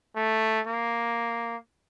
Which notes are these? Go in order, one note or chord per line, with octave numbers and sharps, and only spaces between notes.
A3
A#3